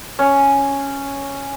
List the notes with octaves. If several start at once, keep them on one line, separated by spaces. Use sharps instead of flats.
C#4